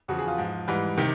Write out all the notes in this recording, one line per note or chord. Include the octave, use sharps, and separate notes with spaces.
E2 C#3 F3 F#4
G#4
F4
G#2 F3
G#2 E3 G3
C3 D#3 G4